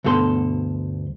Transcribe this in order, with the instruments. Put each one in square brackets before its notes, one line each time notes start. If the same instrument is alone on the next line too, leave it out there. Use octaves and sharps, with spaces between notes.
[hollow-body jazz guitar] D2 G2 B2 A4 A#5 C6